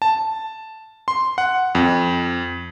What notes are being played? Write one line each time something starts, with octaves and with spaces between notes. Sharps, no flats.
A5
C6
F#5
F2